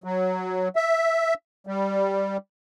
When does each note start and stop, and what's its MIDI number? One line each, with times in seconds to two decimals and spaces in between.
0.04 0.68 54
0.76 1.34 76
1.67 2.37 55